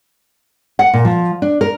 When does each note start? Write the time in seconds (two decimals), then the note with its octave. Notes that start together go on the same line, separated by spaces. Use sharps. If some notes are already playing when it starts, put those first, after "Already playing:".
0.79 F#5
0.93 A#2
1.05 F3
1.42 D4
1.61 A#4